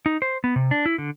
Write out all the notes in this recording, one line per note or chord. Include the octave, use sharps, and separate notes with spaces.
D#4
C5
B3
C3
D4
E4
D3